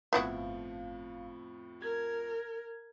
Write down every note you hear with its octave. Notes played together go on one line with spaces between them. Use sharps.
G1 F2 A2 F3 B3 E4 F#4 F5
A#4 G#6